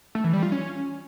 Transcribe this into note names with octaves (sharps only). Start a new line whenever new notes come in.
A3
E3
G3
F4
C#4